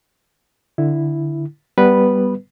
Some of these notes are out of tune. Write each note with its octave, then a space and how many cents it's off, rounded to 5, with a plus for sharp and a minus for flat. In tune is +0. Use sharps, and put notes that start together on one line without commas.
D3 +0 E4 +0
G3 +0 B3 +0 B4 -5